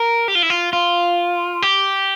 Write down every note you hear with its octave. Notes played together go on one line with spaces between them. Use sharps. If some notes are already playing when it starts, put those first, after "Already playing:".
Already playing: A#4
G4
F4
E4
F4
F4
G4